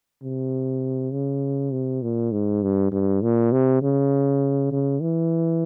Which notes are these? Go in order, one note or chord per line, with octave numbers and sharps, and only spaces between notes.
C3
C#3
C3
A#2
G#2
G2
G2
A#2
C3
C#3
C#3
E3